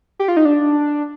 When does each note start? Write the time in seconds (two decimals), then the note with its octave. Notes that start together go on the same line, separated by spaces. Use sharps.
0.19 G4
0.28 F4
0.37 D#4
0.45 D4